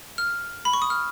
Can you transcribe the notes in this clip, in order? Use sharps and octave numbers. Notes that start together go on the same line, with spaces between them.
F6
B5
C#6
D#6
F6